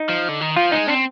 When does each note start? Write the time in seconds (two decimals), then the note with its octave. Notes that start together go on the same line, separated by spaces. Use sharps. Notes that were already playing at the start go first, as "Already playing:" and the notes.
Already playing: D#4
0.09 F3
0.29 D3
0.41 D#3
0.56 F3 F4
0.72 G#3 D#4
0.88 C4 D4